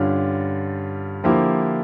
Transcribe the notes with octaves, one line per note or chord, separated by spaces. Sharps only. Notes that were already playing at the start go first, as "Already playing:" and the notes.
Already playing: G2 D3 G3 C#4 F4
D3 F3 A#3 E4 G4